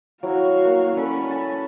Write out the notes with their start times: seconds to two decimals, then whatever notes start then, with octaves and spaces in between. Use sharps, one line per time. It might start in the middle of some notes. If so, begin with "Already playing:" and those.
0.23 F#3 E4 F#4 F5
0.65 A#3
0.96 C#4 A4 B4 D5 B5
1.30 A5 C#6